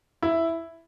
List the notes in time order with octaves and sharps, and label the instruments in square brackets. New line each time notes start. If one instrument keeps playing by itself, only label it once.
[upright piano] E4